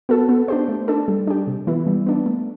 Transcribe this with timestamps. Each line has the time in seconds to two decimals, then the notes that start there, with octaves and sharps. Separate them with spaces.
0.09 B3 F#4 A4
0.29 B3
0.48 D4 G4 C5
0.68 A3
0.88 D4 A4
1.08 G3
1.27 D4 G4
1.47 C3
1.67 E3 B3 E4
1.87 G3
2.06 B3 D4
2.26 A3